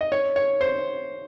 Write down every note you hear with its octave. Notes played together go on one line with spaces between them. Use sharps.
D#5
C#5
C#5
C5